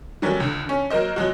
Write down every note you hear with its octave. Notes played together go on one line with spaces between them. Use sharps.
D#3 F#3 G3 A3 C#4
C#2 D3
D3 C#4
F#3 A#3 A#4 C5 D#5
F3 F#3 G#3 F#4